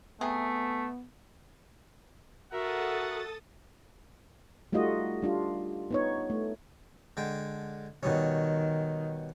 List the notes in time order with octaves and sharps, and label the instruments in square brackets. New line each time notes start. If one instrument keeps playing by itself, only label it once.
[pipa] C3 G#4 [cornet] A3 [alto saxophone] B3
[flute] F#4 [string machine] A4 D#6 A6 [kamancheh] A#4 E5 [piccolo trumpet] F#5
[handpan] G3 A3 D#4 F4 F#4 D#5
G3 D4 F4
B3 D#4 C#5
A3
[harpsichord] D3 G#3 G5
[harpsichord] B2 G3 C#4 [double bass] D#3